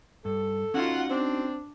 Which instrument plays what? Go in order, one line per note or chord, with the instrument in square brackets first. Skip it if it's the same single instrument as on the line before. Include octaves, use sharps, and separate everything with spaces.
[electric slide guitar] G2 [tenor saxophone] A4
[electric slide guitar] C#4 D#4 F#4 [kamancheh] F4 F#5
[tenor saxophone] C4 [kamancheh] D4